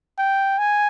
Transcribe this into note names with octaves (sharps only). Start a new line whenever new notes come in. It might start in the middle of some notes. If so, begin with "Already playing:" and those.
G5
G#5